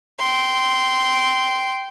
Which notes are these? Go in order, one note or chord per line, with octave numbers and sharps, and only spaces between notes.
G5 C6